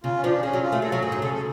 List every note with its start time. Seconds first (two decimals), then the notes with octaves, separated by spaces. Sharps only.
0.04 C#3 F4
0.16 C#4
0.23 F3 D4
0.43 G#3 C#4
0.53 F#3
0.62 F4
0.72 A3
0.82 G#3 A4
0.92 F#3
0.98 F#4
1.02 A2 G#4
1.12 G#2
1.21 C#3 A4
1.34 A4